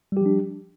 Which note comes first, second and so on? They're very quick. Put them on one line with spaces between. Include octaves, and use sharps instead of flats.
G3 G4 F3 D4